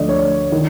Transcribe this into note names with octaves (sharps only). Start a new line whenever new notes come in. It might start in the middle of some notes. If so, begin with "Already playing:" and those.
Already playing: D2 D3 F3 D5 D#5
C#5
D#3